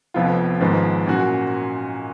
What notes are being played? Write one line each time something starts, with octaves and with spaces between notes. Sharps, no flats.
F1 F2 F3 B3 F4
G#1 G#2 F3 B3
A#2 F#3 C#4 F#4